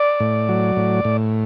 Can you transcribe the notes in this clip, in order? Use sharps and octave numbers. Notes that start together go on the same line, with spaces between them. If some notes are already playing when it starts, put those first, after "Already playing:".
Already playing: D5
A2
F#3
A2
A2